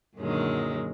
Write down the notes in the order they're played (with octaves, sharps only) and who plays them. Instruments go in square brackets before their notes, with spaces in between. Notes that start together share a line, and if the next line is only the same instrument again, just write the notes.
[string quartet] F#2 A#2 D3 D#3 F#3 G#3